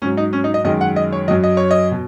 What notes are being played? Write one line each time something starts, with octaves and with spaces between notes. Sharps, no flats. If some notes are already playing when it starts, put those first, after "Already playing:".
G#2 F#3 C#4
D#4
C#4
D#4
D#5
F#2 D#3 G#3 D#5
F#5
D#5
C#5
F#2 F#3 D#5
D#5
C#5
D#5
B2